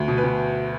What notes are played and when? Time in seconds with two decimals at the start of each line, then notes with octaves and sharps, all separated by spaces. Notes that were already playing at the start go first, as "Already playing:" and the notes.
Already playing: D2
0.08 B2
0.18 B4
0.24 B2